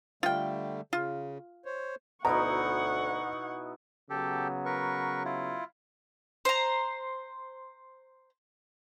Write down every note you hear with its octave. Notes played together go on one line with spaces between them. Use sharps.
D3 G3 A3 F4 G5
C#3 F4
C5 C#5
D2 B2 D#4 E4 F#5 A#5 C#6
C#3 F#3 B3 G4 A4
A#4 B4 C#6
E4 F4
C5 A#5